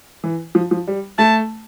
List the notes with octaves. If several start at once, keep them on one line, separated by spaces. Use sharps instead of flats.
E3
F3
F3
G3
A3 A5